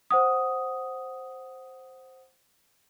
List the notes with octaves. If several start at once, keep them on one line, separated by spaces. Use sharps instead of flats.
C5 F#5 D#6